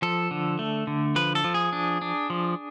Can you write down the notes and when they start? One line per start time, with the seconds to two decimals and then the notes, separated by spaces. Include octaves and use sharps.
0.02 F3 A4
0.31 D3
0.59 A3
0.87 D3
1.16 F3 B4
1.35 A4
1.44 F3
1.54 G#4
1.73 D4
2.02 D4
2.30 F3